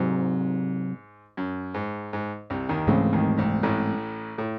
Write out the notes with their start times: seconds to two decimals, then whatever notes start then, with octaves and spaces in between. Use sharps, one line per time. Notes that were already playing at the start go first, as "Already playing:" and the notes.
Already playing: G#2 C3 F#3 C4
1.37 F#2
1.74 G#2
2.13 G#2
2.50 C2 C3
2.69 D#2 D#3
2.87 C#2 G#2 C#3 E3 A3 C4
3.13 D#2 D#3
3.37 C2 C3
3.63 A1 A2
4.38 A2